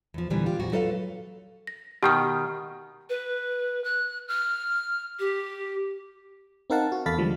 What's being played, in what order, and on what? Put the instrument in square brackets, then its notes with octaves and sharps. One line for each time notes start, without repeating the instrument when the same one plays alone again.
[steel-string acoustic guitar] E2 F3
A#2 D3 E3 G3 B3
F4 G4
F2 A#2 F#4
F#3 F4 A4 B4 D#5 F5
[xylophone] A#6
[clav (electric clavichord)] B2 D#3 [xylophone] G4 G5 F6
[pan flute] B4
F#6
F6
G4
[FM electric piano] C4 D#4 A#4 F5 F#5 A5
F#4
E2 A4 F5 B5 A6 B6
D3 F3 G3 G#3